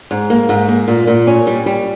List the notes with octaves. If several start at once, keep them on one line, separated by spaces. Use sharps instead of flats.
G#2
A#3
G#2
A#3
A#2
A#2
C#4
G3
G3